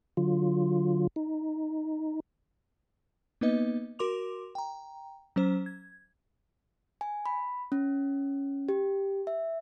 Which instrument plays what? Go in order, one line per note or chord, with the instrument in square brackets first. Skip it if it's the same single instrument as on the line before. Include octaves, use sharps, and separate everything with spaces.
[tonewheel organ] D3 F#3 F4
D#4
[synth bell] A#3 B3 D#4 B4 D#5
F#4 A#4 C6 D6 F7
G5 A#5
F#3 C#4 C5
G#6
[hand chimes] G#5
B5
C#4
G4
E5